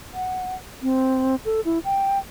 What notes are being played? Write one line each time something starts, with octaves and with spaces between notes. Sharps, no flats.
F#5
C4
A4
E4
G5